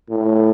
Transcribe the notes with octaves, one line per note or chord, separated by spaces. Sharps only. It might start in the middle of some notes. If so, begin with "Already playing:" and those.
A2